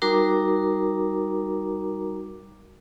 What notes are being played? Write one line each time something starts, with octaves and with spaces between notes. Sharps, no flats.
G3 D#4 F#4 A#4 A#5 D6